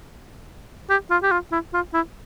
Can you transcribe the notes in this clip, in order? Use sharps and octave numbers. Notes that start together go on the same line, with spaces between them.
G4
F4
G4
F4
E4
F4
E4